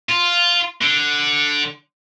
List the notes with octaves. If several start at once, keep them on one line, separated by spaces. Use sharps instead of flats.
F4
D3